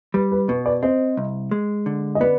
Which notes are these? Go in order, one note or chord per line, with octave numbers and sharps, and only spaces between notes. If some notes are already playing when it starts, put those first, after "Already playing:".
G3 B4
B4
B2 B4
B4 D5
C4 C5 D#5
C2
G#3
D3
D#5
B3 B4 D5